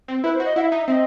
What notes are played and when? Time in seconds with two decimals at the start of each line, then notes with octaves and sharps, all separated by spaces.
0.08 C4
0.23 E4 B4
0.34 C5
0.40 F#4 D#5
0.56 E4 F#5
0.60 E5
0.72 D#4
0.87 C4 D#5 E5